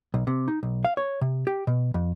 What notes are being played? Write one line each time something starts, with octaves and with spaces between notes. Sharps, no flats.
B1
C3
D#4
B1
F5
C#5
C3
G4
B2
F2